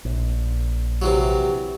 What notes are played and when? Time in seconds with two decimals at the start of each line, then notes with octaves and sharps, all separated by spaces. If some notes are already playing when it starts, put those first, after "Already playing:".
0.05 A#1
1.02 C3 E3 F#3